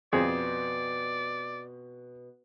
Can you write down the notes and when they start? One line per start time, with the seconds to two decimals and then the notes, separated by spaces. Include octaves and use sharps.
0.13 F2 B2 G#4 D5 E5